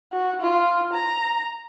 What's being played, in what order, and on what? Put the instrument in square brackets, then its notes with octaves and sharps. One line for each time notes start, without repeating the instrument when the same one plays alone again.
[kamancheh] F#4
F4
A#5